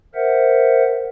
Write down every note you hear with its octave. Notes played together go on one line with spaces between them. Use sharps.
A#4 C5 E5 F#5